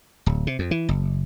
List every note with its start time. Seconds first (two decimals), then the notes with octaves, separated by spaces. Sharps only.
0.26 D1
0.47 C3
0.59 F2
0.71 E3
0.89 F#1